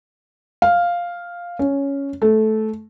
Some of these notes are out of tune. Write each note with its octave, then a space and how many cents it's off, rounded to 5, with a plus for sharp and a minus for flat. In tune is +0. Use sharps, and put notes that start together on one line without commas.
F5 +0
C#4 +5
A3 -15